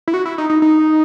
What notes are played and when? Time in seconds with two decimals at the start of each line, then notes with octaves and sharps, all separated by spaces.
0.08 E4
0.14 F#4
0.26 E4
0.38 D#4
0.50 D#4
0.62 D#4